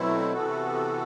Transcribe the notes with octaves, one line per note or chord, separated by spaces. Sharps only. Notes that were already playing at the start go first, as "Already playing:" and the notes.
Already playing: B2 F#3 A3 C4 E4
C3 E3 B3 F#4 A4